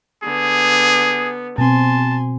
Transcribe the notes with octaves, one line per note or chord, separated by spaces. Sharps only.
D3 B3 G#4
B2 C4 G#5 A5 C6